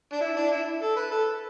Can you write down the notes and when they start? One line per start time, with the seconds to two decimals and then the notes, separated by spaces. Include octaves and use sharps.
0.12 D4
0.21 E4
0.36 D4
0.51 E4
0.82 A4
0.97 B4
1.11 A4